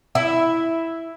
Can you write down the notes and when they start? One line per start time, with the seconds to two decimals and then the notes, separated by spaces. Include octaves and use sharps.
0.15 E4 E5